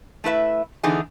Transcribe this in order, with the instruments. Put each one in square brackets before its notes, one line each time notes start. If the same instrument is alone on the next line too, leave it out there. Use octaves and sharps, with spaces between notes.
[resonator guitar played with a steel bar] A3 E4 B4 E5
D3 E3 B3 D#4 G#4